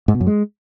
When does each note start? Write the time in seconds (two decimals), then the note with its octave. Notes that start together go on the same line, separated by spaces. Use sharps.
0.08 G#2
0.14 B2
0.21 F#2
0.27 G#3